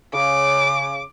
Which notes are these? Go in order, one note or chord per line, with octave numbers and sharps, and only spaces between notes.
C#3 D6